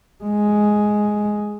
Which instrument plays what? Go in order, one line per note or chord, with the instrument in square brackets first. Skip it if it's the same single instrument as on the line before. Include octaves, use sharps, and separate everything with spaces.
[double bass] G#3